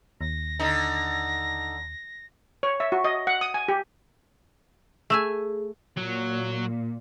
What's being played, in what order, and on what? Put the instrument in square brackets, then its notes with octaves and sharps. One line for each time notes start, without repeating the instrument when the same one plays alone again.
[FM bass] D#2 [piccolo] A#6
[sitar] D3 D#4
[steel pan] C#5
E5
F#4
D#5
F#5
D#6
G#5
G4
[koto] A3 E5 G#5 [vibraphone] G#4
[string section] A#2 [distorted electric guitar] F#3